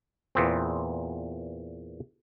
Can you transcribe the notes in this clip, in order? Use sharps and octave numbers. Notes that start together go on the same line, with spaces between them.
E2 A#2 B3 C4